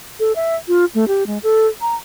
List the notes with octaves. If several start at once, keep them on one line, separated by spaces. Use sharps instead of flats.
A4
E5
F4
A3
G4
G#3
A4
A#5